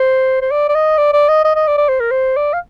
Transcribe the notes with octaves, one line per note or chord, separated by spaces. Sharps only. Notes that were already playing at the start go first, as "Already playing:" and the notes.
Already playing: C5
C5
D5
D5
D#5
D5
D5
D#5
D#5
D#5
D5
D5
C5
A#4
C5
D5
F5